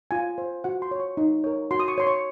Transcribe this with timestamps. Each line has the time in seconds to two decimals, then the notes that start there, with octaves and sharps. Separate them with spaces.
0.11 F4 G#5
0.38 C5
0.64 F#4 F#5
0.82 C6
0.91 C#5
1.00 C#6
1.17 D#4
1.44 A#4 C#5
1.71 F#4 C6
1.80 D#6
1.88 C#6
1.98 C#5 C6
2.07 C#6